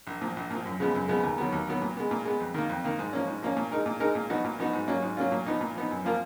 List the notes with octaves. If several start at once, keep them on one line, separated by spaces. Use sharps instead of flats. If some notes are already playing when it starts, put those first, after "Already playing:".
A#1
A#2 F3
A#1
A#2 F3
F#2
C#3 F3 G#3 B3
F#2
C#3 F3 G#3 B3
D#2
D#3 F#3 B3
D#2
D#3 F#3 B3
A#2
G#3 B3
A#2
G#3 B3
F2
D#3 A#3
F2
D#3 A#3
G#2
F3 A#3 C#4
G#2
F3 A#3 C#4
A#2
G#3 D#4 A#4
A#2
G#3 D#4 A#4
A#2
F3 B3 D#4 F#4
A#2
F3 B3 D#4 F#4
G#2
F#3 A#3 C#4 F4
G#2
F#3 A#3 C#4 F4
A#2
F3 B3 D#4
A#2
F3 B3 D#4
F#2
F3 A#3 F4 A#4